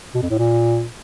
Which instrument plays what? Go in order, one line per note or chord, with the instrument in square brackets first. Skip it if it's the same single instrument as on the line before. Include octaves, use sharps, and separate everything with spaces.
[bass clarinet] B2
F2
A2
A#2